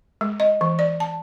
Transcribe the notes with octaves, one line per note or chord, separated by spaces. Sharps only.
G#3
D#5
E3
D5
A5